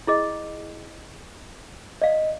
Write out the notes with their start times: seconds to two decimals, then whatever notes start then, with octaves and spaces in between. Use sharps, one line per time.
0.07 E4 G#4 D#5
2.02 D5 D#5 F5